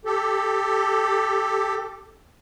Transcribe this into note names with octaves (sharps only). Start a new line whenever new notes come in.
G4 A4